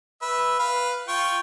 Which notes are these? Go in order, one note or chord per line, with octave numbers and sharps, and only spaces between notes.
B4 E5
B4 F5
F4 G5 C#6